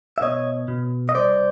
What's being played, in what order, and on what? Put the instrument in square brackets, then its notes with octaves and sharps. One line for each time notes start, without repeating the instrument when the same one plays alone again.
[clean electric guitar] E5
B2 C#5 D#5
B2
D#5
C2 C5 D5